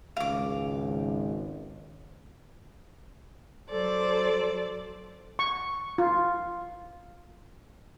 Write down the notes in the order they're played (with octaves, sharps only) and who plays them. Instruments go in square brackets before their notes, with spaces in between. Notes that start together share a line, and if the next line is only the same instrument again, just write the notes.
[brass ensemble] G#1 [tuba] C#2 [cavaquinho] F5 D6
[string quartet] F#3 A4 C5 D5
[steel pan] C#6
F4